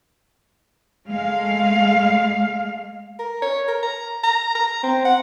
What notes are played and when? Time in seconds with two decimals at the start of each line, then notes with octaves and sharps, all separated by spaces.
1.08 G#3 A3 F5
3.19 A#4
3.42 C#5
3.68 A#4
3.83 A#5
4.24 A#5
4.55 A#5
4.83 C4
5.05 F#5